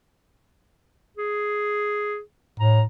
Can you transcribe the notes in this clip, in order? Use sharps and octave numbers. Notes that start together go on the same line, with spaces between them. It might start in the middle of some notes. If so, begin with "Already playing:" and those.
G#4
A2 A#5